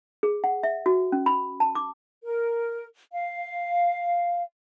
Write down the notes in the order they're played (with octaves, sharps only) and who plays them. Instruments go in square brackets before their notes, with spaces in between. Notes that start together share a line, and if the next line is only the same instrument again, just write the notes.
[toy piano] G#4
F#5
E5
F#4
C#4
B5
A5
D6
[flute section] A#4
F5